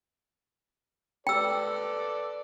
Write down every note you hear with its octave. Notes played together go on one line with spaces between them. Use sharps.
A4 B4 D5 G5 E6